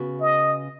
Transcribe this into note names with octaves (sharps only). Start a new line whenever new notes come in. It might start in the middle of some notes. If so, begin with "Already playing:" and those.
Already playing: C#3 B3 F#4
D#5